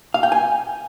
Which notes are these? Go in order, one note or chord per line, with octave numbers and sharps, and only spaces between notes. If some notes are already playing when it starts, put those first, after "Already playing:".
F5
G5
G#5